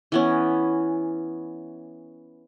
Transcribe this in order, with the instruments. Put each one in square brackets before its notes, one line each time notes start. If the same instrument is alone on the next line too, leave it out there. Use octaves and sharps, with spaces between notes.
[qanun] E3 B3 C#4